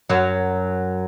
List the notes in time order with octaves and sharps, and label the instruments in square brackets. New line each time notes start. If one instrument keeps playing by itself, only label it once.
[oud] F#2 F#3